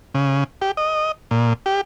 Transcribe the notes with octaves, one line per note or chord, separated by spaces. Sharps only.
C#3
G4
D#5
A#2
G4